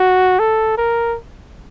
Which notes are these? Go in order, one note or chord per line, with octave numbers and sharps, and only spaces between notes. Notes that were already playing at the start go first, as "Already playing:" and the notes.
Already playing: F#4
A4
A#4